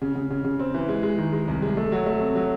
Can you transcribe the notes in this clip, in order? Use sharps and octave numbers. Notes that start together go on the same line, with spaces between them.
C#3
C#3
C#3
C#3
C4
E3
G#3
G#3
D#3
G#3
C2
G#3
A3
F#3
A3
C3
F#3